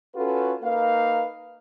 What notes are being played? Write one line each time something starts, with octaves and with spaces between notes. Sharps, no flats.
C#4 F4 F#4 A4 B4
A#3 D#4 B4 F5